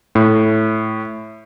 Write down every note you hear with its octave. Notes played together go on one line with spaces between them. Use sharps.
A2